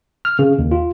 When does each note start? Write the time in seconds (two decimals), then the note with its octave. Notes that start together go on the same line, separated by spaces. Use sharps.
0.25 F6
0.39 C#3
0.59 D#2
0.72 F4